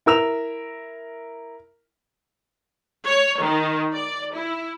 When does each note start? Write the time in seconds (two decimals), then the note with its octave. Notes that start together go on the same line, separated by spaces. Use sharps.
0.06 E4 A#4 E6 F7
3.07 C#5
3.42 D#3
3.94 D5
4.34 E4